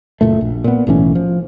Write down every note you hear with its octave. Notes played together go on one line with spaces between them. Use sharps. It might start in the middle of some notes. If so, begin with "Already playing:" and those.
F#1 A#2 A3
A#1
A#2 B3
B1 A2 E3 C#4
F3